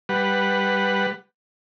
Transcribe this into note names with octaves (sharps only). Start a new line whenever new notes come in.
G3 B4 F#5